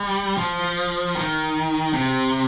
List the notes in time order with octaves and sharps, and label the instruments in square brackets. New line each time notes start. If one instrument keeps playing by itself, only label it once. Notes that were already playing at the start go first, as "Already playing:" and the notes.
Already playing: [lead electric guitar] G3
F3
D#3
C3